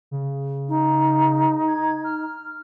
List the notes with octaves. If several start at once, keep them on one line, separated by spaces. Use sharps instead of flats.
C#3
D#4
G#6
F6